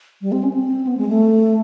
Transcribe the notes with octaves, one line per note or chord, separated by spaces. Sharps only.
G3
C4
C#4
C4
B3
G#3
A3